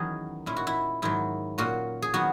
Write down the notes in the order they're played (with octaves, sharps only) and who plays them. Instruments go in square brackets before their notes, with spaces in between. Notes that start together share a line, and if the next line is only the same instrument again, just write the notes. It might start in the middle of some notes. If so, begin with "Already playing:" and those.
Already playing: [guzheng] E2 D#3 F#3 C#4 G#4 A#4
A#2 G#3 C#4 E4
F#4
E4
G#2 D#3 F#3 E4
A#2 A#3 C#4 F#4
G#4
D#3 F#3 B3 F#4